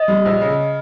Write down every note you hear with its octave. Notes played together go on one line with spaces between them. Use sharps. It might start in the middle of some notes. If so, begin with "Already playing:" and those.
Already playing: D#5
G3
A#1
C#3